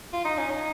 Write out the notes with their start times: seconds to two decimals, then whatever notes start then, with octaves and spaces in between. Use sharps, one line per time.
0.13 F4
0.25 D#4
0.38 C#4
0.50 D#4